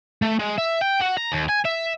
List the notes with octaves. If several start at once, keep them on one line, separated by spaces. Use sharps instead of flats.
A3
G#3
E5
G5
F#4
A#5
D#2
G#5
E5